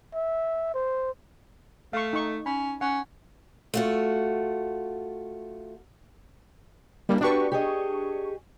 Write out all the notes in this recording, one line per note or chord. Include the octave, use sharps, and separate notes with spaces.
E5
C5
A3 F5 C#6
D#4 C#6
C#4 B5
C#4 F#5
A3 F4 F#4
G3 A#3 D4 E4
D4 F#4 G4 B4 C#6
G4 G#4 D#5